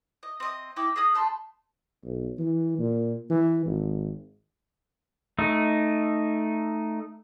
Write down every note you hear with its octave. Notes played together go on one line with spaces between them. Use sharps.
D#5
C4 D#5
D#4 E4 G5 D6
G#4 D#5 D#6 F6
A3 A5 B5 C6
B1
E3
A#2
E3
G#1
A3 D#4